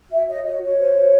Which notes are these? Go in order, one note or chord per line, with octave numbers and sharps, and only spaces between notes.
F#4 E5
C#5 D#5
F#4 D#5
F#4 C#5
C5
F#4